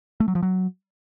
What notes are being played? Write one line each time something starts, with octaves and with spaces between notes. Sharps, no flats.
A3
F#3
F3
F#3